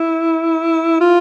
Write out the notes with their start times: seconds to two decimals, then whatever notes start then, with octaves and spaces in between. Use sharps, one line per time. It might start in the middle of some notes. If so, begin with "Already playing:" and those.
Already playing: E4
1.01 F4